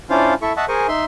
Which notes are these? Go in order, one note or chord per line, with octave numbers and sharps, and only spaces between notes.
C#4 D4 E4 F4 C5 F5
E4 A4 E5 C#6
D#5 E5 F#5 A5 C#6
G#4 A#4 C5 G#5 C#6
D#4 E5 C6